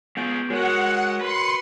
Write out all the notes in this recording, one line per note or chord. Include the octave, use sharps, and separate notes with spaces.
G#3 B3 F4 G#4 G6 D7
G#3 F#4 A#4 C#5 F#5
B4 C6 C#7